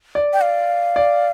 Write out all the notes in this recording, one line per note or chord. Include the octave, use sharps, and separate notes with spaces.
D5
G5
F5
D5